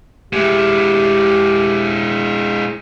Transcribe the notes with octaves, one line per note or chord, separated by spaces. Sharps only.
G#3 E4 G4